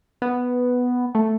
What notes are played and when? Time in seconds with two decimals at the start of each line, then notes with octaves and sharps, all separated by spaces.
0.22 B3
1.15 A3